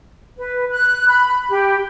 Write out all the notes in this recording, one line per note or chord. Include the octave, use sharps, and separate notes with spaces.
B4
F#6
B5
G4